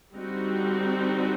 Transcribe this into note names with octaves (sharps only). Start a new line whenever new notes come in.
D3 G3 C4 D#4 F#4